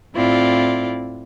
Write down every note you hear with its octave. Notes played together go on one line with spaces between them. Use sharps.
A2 C4 E4 F4 D5